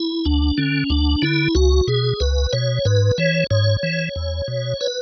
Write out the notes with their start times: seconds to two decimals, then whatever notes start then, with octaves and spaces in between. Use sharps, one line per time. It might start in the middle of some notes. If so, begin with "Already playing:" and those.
Already playing: E4
0.25 D2 D4
0.57 D3 C#4
0.90 D2 D4
1.22 D3 E4
1.55 C#2 F#4
1.87 B2 G#4
2.20 C#2 B4
2.53 B2 C#5
2.85 G#2 B4
3.18 E3 C#5
3.51 G#2 C#5
3.83 E3
4.16 E2
4.48 B2
4.81 B4